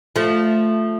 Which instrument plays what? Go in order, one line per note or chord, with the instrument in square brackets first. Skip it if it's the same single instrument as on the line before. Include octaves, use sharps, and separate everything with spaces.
[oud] F3 A3